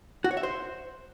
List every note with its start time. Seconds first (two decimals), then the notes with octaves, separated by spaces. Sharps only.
0.24 F#4
0.31 C#5
0.37 E5
0.43 C5